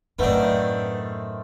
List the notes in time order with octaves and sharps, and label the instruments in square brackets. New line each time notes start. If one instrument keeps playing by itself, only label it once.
[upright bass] F#2 A2 [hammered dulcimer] D#3 A3 C4 [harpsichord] B3 D4